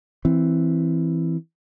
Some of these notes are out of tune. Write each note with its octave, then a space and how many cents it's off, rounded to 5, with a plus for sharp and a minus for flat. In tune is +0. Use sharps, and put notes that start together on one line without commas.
E3 +0 C4 +0